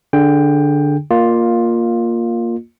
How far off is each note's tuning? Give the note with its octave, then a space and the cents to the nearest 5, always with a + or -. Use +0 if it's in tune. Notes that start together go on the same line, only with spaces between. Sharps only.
D3 +0 G#4 +0 G5 +15
A#3 +0 F4 +10 D#5 -40